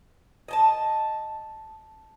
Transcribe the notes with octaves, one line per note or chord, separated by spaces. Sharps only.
D#5 G#5 A5